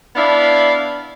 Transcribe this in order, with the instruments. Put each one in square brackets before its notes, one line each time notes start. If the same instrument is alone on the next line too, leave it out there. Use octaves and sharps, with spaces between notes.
[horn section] B3 D4 E4 D5 F5